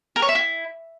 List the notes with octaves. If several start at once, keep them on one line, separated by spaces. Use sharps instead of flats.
A#4
C#5
E5
E4